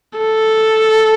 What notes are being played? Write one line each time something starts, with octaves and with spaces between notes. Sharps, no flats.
A4